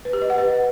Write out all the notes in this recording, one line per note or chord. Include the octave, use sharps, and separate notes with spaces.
B4
G4
D#5
F#5
B4